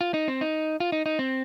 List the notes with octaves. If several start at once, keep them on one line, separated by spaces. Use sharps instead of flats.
F4
D#4
C4
D#4
F4
D#4
D#4
C4